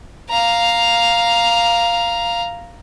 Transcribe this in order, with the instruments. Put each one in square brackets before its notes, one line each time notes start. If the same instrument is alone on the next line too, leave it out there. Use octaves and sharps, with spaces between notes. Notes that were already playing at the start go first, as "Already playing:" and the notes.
[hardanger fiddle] F5 A#5